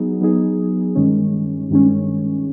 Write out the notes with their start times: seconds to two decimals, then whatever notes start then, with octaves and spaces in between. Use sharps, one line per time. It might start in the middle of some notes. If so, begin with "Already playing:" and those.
Already playing: F#3 B3 D#4 G#4
0.21 F#3 B3 D#4 G#4
0.96 G2 D#3 G#3 C#4
1.70 G2 D#3 G#3 C#4